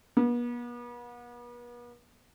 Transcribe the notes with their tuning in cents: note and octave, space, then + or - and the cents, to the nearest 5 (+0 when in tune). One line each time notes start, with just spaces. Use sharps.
B3 -40